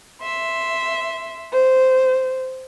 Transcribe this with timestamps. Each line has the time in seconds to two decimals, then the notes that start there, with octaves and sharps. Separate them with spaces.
0.22 E5 C6
1.51 C5